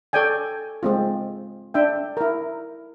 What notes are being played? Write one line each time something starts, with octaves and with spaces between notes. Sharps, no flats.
A4 C#5 D5 G5 G#5
G#3 C4 F4
D4 E5 G5
E4 A#4